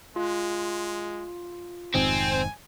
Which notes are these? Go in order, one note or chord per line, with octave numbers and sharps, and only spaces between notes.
G#3 F4
F1 G#2 D#3 C4 G#5